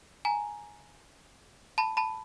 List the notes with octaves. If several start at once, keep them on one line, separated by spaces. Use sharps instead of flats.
G#5 A#5
A5 B5
A5 B5